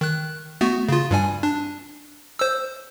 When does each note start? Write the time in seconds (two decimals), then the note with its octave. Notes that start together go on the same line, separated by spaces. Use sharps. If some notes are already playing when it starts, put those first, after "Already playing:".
0.01 D#3 F#6
0.61 A3 B3 F#4
0.89 C#3 F4
1.11 G2 G3 G#5
1.43 D4
2.39 C5 E6